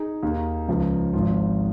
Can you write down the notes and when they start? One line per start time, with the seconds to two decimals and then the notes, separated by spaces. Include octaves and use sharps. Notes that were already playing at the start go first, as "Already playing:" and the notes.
Already playing: D#4 G#4
0.23 D#2 D#3 A#3
0.68 C#2 C#3 F3
1.13 G#1 G#2 F3 F4